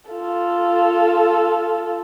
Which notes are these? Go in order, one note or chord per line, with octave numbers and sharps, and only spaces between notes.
F4 A4